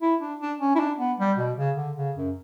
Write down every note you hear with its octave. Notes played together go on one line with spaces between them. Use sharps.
E4
D4
D4
C#4
E4
D4
B3
G3
B2
C#3
D3
C#3
F#2